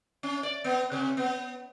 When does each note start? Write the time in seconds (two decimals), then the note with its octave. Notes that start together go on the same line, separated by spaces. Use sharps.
0.23 C#4
0.43 D5
0.64 B3
0.92 C3
1.17 B3